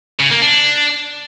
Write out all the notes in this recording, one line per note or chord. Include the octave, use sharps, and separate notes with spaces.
C#3
A#3
D4